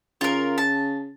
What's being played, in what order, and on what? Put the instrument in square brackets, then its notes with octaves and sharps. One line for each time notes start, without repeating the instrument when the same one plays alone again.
[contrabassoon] C#3 [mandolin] F4 A#4
[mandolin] A5